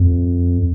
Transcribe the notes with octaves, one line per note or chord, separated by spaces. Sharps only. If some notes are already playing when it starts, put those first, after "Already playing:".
Already playing: F2